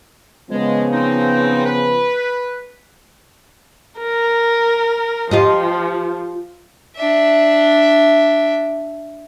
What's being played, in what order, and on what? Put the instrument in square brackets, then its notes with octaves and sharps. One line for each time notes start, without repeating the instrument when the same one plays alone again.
[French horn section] C#3 F3 B3 [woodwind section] G#3
[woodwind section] C4 D#4
B4
[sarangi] A#4
[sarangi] F3 [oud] F4 G4 D#5
[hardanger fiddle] D4 E5